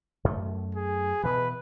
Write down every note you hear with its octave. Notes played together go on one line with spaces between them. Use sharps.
F#2 A3
G#4
B2 E3 B4